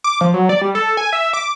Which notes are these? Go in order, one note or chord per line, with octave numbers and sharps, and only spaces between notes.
D6
F3
F#3
D5
G3
A4
G#5
E5
D6